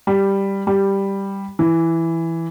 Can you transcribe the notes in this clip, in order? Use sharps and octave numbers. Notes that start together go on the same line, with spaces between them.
G3
G3
E3